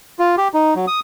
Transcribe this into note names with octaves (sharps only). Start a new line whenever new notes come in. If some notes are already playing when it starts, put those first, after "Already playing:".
F4
G4
D#4
F#3
D#6